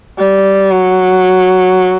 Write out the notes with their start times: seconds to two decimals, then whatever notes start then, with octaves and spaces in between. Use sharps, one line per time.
0.18 G3
0.71 F#3